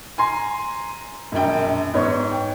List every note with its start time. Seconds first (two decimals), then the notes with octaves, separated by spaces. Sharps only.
0.18 G#5 A#5 C6
1.32 E1 A#1 F#2 G5
1.94 G#2 B3 C#5 C#6
2.31 G5